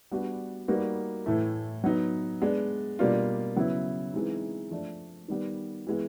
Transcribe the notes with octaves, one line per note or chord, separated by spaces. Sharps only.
G3 B3 D4 F#4
G3 A#3 D#4 F#4 B4
A2 E3 A3
F#3 B3 D#4
G#3 B3 D4
B2 G3 A#3 D4 F4
C#3 F#3 B3 E4
E3 G#3 C4 D#4
F3 A3 D4
D#3 G3 B3
E3 G#3 B3